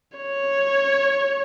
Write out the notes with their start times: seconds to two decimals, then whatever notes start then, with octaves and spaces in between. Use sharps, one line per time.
0.18 C#5